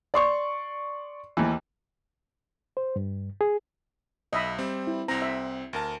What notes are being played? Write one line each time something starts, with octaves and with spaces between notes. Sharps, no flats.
D5 C6 C#6
D#2 E3
C5
G2
G#4
B1 D#5 E5 B5
G3 C4
E4
C2 C4 A#5
E5
D2 A#4 A5